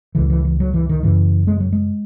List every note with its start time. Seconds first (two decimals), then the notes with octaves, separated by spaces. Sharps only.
0.15 C#2 C#3 E3
0.30 E3
0.45 E3
0.60 F#3
0.74 E3
0.89 D#3
1.03 F#2 C#3 E3
1.47 G#3
1.60 F#3
1.73 G#3